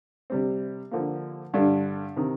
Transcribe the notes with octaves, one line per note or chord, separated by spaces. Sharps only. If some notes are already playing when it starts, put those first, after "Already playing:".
C3 G3 C4
D3 F3 A#3
G2 D3 G3 D4
C3 D#3